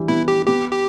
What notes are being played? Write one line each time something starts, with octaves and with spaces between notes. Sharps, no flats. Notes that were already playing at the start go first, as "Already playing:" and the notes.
Already playing: E3 G3
B3 E4
G4
B3 G4
G4